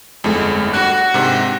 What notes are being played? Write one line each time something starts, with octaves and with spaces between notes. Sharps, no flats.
G1 F2 G#3 A3 E4
D3 G3 F#4 F#6
G#2 C3 D#3 D4 B4